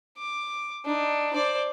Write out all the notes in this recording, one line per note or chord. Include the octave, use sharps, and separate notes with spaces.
D6
D4 D#4
C5 D5